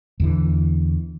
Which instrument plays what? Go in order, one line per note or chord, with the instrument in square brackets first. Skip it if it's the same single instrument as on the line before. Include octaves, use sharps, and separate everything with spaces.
[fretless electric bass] E2 D3 E3